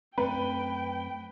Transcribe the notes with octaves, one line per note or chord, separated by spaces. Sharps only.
F#2 A3 C4 B4 G5